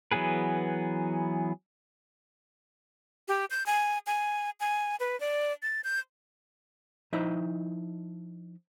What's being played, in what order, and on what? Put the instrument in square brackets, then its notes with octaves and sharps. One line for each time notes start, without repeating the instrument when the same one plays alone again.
[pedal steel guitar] E3 F#3 B3 G#4 B4
[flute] G4
G6
G#5
G#5
G#5
B4
D5
A6
G6
[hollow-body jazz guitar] F3 D#4 E4 D#5 E5